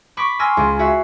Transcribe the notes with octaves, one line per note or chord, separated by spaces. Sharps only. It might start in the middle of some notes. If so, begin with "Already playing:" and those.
B5 C#6 D6 B6
G#5 C6 E6 F6 A#6
C#2
F#4 E5 C7